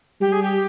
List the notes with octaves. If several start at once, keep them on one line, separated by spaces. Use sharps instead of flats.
G3 G4
G#4
G4